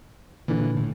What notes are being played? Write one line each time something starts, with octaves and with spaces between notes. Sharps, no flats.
A#2 D3 E3
A2